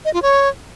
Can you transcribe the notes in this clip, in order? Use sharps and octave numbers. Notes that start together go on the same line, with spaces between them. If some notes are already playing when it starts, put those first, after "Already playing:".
D#5
F4
C#5